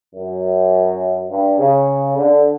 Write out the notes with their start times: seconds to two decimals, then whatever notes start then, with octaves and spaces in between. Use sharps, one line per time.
0.15 F#2
1.29 G2
1.58 C#3
2.15 D3